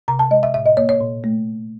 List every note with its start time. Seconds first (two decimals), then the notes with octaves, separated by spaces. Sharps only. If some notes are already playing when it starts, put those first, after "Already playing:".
0.08 C3 A#5
0.19 A5
0.31 G#3 D#5
0.43 E5
0.54 A2 E5
0.66 D#5
0.77 A#3 C#5
0.89 C#5
1.01 A#2
1.24 A3